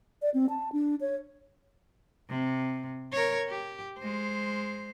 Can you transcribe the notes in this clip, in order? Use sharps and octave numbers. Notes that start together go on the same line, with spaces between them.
D5
C4
A5
D4
C#5
C3
A#4 C#5
G4
G#3 C5